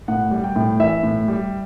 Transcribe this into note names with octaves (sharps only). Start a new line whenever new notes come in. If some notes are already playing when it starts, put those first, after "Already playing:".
A2 F#5
G3
G5
A2
E3 E5
A2
G3